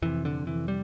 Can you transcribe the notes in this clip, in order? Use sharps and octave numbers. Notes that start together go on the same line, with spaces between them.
F2 C3 E3
D3
E3
G3